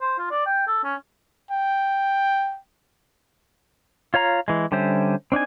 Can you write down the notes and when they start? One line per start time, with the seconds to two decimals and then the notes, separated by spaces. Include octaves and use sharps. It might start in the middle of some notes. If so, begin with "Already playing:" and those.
0.01 C5
0.18 F4
0.31 D5
0.46 G5
0.67 A4
0.84 C#4
1.51 G5
4.14 F4 C#5 F5 A#5
4.48 E3 G#3
4.72 D3 G3 C#4 C5 E5
5.32 C4 D4 D#4 G#5